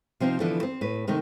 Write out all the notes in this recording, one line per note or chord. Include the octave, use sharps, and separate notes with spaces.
C3 F3 C4 D#4 F4
D3 E3 F3 B3 E4 A4
C4
A2 B4
C3 D#3 A3 D#4